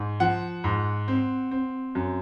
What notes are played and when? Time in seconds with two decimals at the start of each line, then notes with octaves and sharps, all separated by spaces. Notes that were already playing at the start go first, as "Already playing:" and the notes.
Already playing: G#2
0.20 F3 F#5
0.64 G#2
1.08 C4
1.51 C4
1.95 F#2